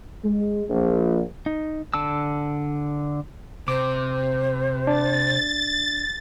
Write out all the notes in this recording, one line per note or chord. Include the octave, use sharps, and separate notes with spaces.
G#3
A#1
D#4
D3 A5 E6
C3 C5 D6
D4 A6